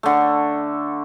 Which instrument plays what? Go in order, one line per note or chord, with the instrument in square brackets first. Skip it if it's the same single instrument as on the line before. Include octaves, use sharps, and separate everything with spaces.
[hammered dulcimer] D3 A3